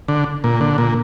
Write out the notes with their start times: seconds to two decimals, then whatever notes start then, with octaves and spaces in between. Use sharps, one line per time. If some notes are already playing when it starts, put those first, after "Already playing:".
0.08 D3
0.44 A#2
0.61 D3
0.78 A#2